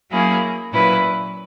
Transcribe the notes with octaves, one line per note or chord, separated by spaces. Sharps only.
F#3 A#3 C#4 E4 G#4
A#2 F#3 C#4 E4 B4